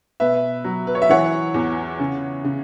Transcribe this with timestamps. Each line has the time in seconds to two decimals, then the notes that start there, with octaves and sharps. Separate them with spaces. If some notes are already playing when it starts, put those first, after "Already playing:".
0.20 B2 B4 E5
0.64 F#3
0.87 B4
0.95 C#5
1.02 E5
1.09 E3 C#5 F#5
1.54 E2
2.00 C#3
2.44 C#3